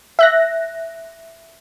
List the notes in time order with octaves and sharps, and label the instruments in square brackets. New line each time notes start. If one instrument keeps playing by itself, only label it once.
[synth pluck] E5 F#6 A#6